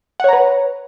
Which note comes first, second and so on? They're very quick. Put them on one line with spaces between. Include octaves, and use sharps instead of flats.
F#5 C#5 A#5 B4